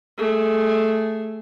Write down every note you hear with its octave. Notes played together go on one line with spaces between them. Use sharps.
A3 G#4